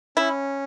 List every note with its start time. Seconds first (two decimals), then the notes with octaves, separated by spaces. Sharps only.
0.17 C#4 E4